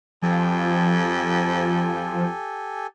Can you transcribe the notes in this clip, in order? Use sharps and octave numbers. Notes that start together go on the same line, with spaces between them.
F2 F3 G4 A4 G#5